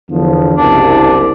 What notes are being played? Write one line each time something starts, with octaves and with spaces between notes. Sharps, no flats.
E2 D3 F3
F#1 C2 D4